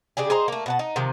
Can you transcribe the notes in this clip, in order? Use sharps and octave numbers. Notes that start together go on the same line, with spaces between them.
C#3 D4 G4 G#4
G#4 C5 D#5 A#5
A3 A#3
B2 F#5 A5
D#4
C3 D#3 F3